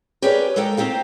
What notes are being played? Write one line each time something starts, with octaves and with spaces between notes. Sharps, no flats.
G4 G#4 A#4 B4 C#5 D5
G#3 A4 A#4 D#5 G5
A3 C4 D#4 G4 F5